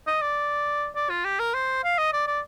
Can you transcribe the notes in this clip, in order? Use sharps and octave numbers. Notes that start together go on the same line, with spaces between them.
D#5
D5
D5
F4
G4
A#4
C5
F5
D#5
D5
D5